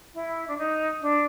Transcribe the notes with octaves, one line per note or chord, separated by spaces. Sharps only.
E4
D4
D#4
D4